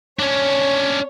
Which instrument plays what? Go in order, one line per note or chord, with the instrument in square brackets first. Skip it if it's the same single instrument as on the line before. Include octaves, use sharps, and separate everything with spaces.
[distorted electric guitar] C#4 D4 [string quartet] C#5